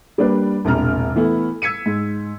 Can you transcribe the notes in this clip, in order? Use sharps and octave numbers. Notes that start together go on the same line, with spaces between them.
G3 A#3 D4 B4
E1 A#1 C3 A#5 F6
E3 A3 B3 E4
E6 G#6 B6 C#7 D#7
G#2